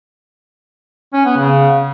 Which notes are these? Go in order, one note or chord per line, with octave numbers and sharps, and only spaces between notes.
C#4
B3
C#3